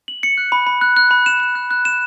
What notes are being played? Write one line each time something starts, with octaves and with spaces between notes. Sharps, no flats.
F#7
C#7
F#6
B5
B5
F#6
F#6
B5
E7
E7
F#6
F#6
E7